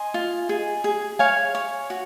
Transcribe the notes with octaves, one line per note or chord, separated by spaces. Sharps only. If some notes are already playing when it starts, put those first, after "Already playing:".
Already playing: D#5 G#5 C6
F4
G#4
G#4
C#5 F5 G#5
C#5
F#4